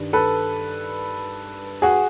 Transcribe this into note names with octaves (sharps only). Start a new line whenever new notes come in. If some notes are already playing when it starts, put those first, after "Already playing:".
Already playing: G2 D#3 G3
A4 B4
F#4 G#4